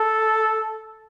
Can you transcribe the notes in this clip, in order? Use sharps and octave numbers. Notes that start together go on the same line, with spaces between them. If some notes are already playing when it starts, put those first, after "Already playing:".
Already playing: A4